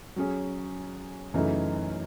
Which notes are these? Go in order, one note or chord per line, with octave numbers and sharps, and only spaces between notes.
F#3 C#4 G#4
F#2 C#3 E3 A3 D#4